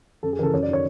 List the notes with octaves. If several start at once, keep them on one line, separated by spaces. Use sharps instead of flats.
F#2 A4
G#4
C#3 E3 A4 A#4
F#2 C#5
D5
D#3
C#5